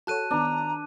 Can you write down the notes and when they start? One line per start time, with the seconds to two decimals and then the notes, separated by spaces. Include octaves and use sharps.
0.07 F#4 A4 C#5 A5 F#6 D#7
0.31 D#3 B3 D4 A#5